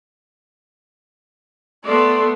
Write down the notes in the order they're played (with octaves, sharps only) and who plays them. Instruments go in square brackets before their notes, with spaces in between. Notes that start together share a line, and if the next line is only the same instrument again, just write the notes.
[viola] A3 B3 [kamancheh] D5 C6